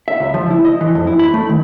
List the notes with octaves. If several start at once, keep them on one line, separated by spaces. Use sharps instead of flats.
E5
C#2
F3
E4
D#5
E3
F2
E4
B5
A3
D#3